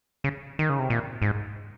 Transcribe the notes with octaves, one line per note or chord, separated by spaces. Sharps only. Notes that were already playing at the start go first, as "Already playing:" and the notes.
C#3
D#3
C#3
C3
A#2
G#2